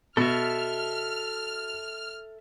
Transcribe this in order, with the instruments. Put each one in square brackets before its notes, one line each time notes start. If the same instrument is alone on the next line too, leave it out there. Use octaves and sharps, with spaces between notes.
[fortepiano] B2 [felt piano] F#4 [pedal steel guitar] A4 E5 [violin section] F6